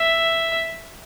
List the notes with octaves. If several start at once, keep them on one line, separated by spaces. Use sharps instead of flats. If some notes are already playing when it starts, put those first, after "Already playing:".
Already playing: E5